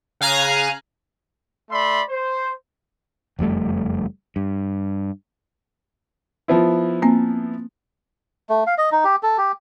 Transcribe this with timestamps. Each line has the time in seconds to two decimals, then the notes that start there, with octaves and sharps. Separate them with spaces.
0.21 C#3 F5 G#5 A#5 F#6
1.71 A3 D5 E5 B5 C6
2.09 C5
3.39 F#1 F2 G3 A3
4.36 G2
6.48 F3 B3 E4
7.02 A#3 C4
8.49 A3
8.67 F5
8.78 D#5
8.92 D#4
9.04 G4
9.23 A4
9.38 G4